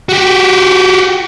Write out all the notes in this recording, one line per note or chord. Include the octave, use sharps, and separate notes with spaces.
F#4 G4